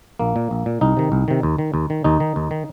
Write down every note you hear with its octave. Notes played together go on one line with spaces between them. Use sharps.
A#1 A#3
A#2
A#1
A#2
C2 D#4
C3 D#3
C2
C3 D#3
D#2
D#3
D#2
D#3
D#2 D#4
D#3
D#2
D#3